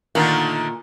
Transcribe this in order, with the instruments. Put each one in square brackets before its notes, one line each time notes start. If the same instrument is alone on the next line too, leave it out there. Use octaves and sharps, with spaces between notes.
[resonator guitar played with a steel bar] A#2 [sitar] D3 D#3 A3